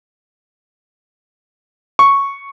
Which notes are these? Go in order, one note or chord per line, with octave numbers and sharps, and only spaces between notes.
C#6